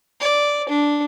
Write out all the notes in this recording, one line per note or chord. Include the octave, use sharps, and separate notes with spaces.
D5
D4